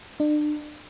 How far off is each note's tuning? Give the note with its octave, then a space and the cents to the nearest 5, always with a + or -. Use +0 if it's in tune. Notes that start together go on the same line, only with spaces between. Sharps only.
D4 +35